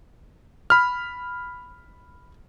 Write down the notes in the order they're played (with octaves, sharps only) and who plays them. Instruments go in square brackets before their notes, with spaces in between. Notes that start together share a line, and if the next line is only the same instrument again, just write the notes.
[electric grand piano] B5 F6